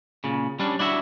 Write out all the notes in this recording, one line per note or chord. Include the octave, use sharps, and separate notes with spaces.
A#2 C#3
G3 C#4 D4
D4 E4 F#4 E5